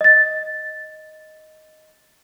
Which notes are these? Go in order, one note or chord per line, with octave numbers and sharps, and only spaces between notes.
D#5 A6